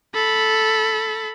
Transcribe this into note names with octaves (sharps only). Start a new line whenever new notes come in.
A4 B5